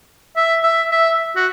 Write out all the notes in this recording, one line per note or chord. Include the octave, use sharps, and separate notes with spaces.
E5
E5
E5
F#4